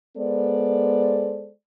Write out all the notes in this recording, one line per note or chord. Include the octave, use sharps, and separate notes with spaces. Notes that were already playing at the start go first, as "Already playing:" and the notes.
G#3 B3 A4 C5 D5